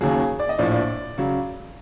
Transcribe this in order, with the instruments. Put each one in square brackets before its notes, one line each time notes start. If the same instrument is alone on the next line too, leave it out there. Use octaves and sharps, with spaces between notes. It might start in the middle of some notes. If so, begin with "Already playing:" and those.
[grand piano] D#2 C#3 F#3 G#4
D5
D#5
A#1 A2 F3 D5
D5
C#3 F#3